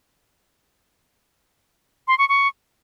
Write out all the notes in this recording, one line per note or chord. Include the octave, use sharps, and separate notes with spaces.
C6
C#6
C#6